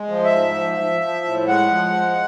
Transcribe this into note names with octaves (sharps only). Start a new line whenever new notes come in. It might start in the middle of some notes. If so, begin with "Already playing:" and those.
Already playing: G#3
F3
E5
G#2
F3
F3
F3
A2
G#3 F#5
F3
G#3